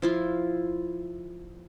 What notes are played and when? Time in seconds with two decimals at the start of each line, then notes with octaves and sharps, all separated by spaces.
0.02 F3 E4 F4